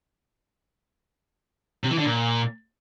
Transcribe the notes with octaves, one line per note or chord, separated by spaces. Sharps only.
C3
E3
D3
A#2